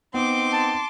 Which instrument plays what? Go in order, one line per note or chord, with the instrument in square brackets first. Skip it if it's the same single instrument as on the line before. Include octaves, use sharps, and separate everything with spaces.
[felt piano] B3 [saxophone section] C4 D#4 [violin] C6 D6
[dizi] A5